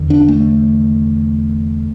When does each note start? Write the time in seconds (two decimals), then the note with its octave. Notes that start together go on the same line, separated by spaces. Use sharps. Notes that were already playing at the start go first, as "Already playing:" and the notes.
Already playing: E2 D3
0.10 D4
0.28 A3